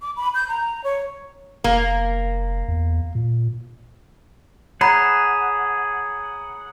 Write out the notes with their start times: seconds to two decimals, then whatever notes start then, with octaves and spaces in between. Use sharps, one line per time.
0.02 D6
0.17 B5
0.35 G6
0.49 A#5
0.84 C#5
1.64 F1 A#3
2.68 E2
3.15 A#2
4.81 G#4 C#5 F#5 A#5 B5